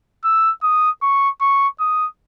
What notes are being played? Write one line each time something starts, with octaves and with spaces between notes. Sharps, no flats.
E6
D#6
C#6
C#6
D#6